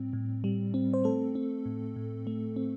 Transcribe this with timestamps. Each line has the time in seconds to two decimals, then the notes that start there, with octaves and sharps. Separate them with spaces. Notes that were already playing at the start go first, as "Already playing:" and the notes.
Already playing: A2 G3 C4
0.13 A2
0.44 G3
0.74 C4
0.94 C5
1.04 A3 A4
1.35 C4
1.66 A2
1.96 A2
2.27 A3
2.56 C4